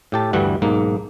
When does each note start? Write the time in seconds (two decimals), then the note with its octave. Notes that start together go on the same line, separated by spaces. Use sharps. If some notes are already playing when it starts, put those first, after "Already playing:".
0.12 A2 G4 A5
0.33 D2 G2 E3 G3 F#5
0.62 B1 G#2 A#3